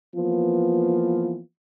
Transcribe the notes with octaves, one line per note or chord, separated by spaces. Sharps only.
E3 F3 A#3 B3 F4